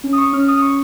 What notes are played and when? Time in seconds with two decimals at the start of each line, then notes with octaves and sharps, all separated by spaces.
0.04 C#4
0.13 D#6
0.18 C#6
0.33 C#4 F6
0.48 D#6
0.62 C#6